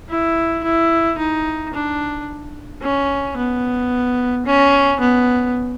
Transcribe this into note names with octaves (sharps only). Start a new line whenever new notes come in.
E4
E4
D#4
D4
C#4
B3
C#4
B3